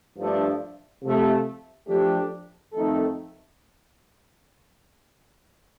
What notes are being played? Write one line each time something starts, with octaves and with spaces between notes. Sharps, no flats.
G2 F3 A3 D4
C3 F3 A3
F3 A3 D4 G4
F2 D#3 A3 D#4 A4